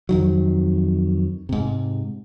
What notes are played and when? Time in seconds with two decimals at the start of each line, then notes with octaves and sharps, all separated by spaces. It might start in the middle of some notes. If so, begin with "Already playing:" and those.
0.09 F2 D#3 F#3
1.49 G#2 C3